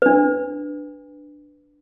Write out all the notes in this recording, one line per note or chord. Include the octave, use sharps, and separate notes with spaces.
D4 B4